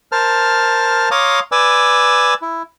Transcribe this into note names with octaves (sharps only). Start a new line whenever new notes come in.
A#4 C5 A5 F6
C#5 F5 A#5 C6 D6 D#6
B4 D5 G#5 D6 E6
E4